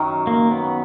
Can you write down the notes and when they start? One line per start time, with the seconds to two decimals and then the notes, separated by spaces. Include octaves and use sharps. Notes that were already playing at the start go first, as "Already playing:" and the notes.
Already playing: F#2 D#3 F#3
0.27 A#3
0.51 B3